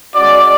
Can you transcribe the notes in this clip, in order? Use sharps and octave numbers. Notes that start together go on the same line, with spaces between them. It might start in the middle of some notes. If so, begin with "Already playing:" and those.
G#3 C#4 F#4 D5